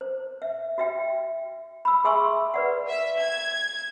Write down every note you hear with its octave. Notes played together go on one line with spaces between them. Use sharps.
C5
E5
F#4 E5 G5
B5 E6
G#4 E5 G#5 C6 C#6 E6
B4 D5 F#5
E5
G#6